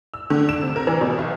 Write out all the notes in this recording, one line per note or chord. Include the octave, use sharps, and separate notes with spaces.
E6
D3
E7
C3
A#4
E3
B2
B1